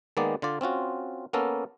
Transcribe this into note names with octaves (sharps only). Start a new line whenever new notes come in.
D#3 G#3 A#3 B3 D5
D3 F4 D5
C4 C#4 F4 F#4
A#3 B3 C#4 A4 A#4